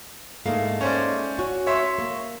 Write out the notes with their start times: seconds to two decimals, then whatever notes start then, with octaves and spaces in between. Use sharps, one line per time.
0.46 G#2 A3 A#3 F5
0.81 C#4 C5 D5
1.39 C#4 F#4
1.67 C#5 E5 C6
1.98 A#3